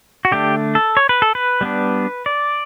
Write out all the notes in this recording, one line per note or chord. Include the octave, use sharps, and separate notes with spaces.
F#4
D3 A3 D4 G4
A4
C#5
B4
A4
B4
G3 B3 D4
D5